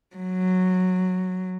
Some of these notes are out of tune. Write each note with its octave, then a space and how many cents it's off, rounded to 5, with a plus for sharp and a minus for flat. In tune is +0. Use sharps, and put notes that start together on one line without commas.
F#3 -5